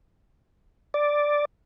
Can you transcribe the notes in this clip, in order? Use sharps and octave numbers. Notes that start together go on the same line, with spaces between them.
D5